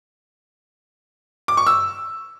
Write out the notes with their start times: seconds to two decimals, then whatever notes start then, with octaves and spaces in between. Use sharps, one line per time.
1.48 D6
1.57 C#6
1.67 E6